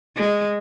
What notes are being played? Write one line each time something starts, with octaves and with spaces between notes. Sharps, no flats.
G#3